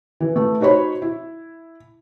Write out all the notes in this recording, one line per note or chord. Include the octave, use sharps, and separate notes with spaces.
E3
A3 B4
D#4 F#4 C5 C#5 B5
E4